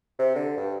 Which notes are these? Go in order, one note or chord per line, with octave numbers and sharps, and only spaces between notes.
C3
D3
G2